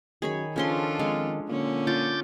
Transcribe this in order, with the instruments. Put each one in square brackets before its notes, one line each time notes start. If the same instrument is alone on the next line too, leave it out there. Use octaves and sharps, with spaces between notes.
[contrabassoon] F#2 [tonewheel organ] D#3 [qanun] G#4 C#5 B5
[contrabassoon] C#3 [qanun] F3 C#4 C6 [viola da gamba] D4 F4 A4
[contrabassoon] F2 [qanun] G#3 F5
[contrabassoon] A#2 [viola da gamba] D3 C#4
[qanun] F4 [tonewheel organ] D6 G6 A6